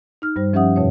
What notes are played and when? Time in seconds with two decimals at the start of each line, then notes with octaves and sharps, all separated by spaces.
0.22 D#4 F6
0.36 G2 G3 C5
0.53 F3 C#4 G4 E5 F#5 D#6
0.76 F2 B2 C#5